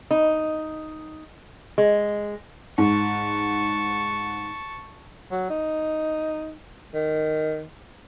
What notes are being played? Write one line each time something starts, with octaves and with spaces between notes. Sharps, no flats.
D#4
G#3
G#2 A5 C#6
F#3
D#4
D#3